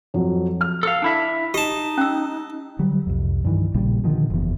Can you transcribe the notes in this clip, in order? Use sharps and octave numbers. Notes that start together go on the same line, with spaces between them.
F2 F#3
F6
A4 F5
D4 E4 E5
D#4 G4 D#5 A5
C#4 E6
D3 F#3 G3
C2 F2
G2 D#3 E3
A#1 A#2 C#3 G3
A#2 D3 D#3 F3
F#1 E2